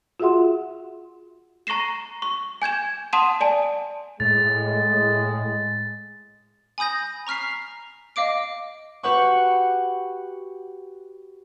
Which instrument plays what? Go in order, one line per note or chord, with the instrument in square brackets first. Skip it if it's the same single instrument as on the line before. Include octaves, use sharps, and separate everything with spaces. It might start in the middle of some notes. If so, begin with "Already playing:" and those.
[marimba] F4 F#4 G#4 E5 F#5 C6
[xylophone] A#5 C#6 A#6 C7 E7
C#6
G#5 G6 G#6 E7
F#5 A5 C6 D#6 D#7 E7
D5 G#5 A5
[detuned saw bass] A2 [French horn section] G#3 [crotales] A6
[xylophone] G#5 B5 D#6 G6 A#6
A#5 C#6 F6 B6 C7
D#5 F5 D6 D7
[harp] F#4 G4 B4 F#5 C#6